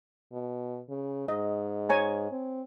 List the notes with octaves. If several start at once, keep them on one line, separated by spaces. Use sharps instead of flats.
B2
C#3
G#2 D#5
C#5 G#5 A#5
C4